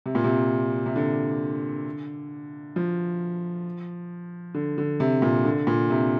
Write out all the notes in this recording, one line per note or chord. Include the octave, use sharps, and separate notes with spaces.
C3
A#2
C3
C3
D3
F3
D3
D3
C3
A#2
D3
A#2
C3